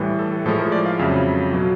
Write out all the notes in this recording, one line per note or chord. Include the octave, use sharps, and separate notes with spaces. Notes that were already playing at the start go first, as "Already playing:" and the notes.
Already playing: A2 E3 G3
A4
A2 F3 G#3 A4
A#4
D5
F5
F2 C#3 F#3 E5
B2 F#3